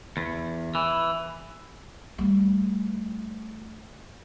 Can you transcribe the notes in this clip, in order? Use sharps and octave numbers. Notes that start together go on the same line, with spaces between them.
E2
E3
G3 A3